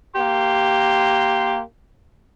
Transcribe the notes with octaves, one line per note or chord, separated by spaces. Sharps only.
A#3 G4 C6